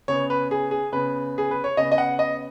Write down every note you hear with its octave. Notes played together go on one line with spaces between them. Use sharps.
C#3 B3 C#5
B4
G#4
G#4
C#3 B3 B4
G#4
B4
C#5
C#3 B3 D#5
D#5
F#5
D#5